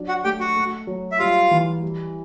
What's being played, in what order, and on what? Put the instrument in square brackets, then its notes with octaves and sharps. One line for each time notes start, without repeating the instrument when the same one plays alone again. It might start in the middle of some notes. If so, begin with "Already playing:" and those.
Already playing: [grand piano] F#3 D4
[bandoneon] F#4 F#5
[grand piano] A3 [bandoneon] G4 G5
[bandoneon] F#4 F#5
[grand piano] A3
F#3
[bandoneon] E5
[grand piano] G3 [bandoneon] F4 F5
[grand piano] E3
G3